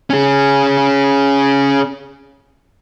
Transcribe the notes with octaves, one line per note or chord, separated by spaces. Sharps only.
C#4 G#4